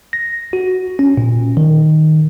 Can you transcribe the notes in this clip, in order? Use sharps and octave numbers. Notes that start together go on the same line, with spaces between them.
A#6
F#4
C#4
A#2
D#3